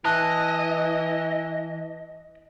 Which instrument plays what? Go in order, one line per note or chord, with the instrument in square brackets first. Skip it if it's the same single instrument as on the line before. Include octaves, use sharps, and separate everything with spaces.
[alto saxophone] E3 [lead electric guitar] D#5 [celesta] A5 F#6